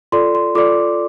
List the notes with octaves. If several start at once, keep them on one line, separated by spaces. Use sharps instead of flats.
F4 A4 D5 C6
C6
F4 A4 D5 D6